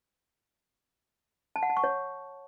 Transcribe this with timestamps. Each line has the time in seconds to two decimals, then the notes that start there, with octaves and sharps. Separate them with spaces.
1.56 A5
1.63 F#5
1.70 A5
1.77 C#6
1.84 C#5